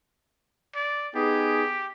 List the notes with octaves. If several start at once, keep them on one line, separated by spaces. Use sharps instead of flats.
D5
B3 D#4 G4 G#4